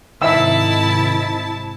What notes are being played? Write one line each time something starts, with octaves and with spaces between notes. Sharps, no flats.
G#2 C3 D#3 E4 E5 A5 E6